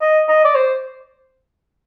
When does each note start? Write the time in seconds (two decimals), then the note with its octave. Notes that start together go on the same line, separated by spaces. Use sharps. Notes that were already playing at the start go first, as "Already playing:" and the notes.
0.01 D#5
0.28 D#5
0.44 D5
0.55 C5